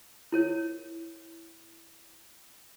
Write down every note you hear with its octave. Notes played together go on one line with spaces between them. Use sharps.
E4 A#4 C#5